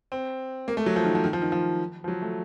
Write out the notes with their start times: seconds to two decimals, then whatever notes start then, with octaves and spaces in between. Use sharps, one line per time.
0.12 C4
0.68 A#3
0.77 A3
0.86 F#3
0.96 F3
1.05 D#3
1.15 F3
1.24 D#3
1.33 F3
1.42 D#3
1.52 F3
2.04 F3
2.08 F#3
2.22 A3